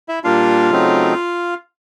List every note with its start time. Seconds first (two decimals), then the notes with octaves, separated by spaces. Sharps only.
0.08 E4 E5
0.24 A#2 G3 A#3 D4 F4 F5
0.71 C#3 F#3 A3 C4 D#4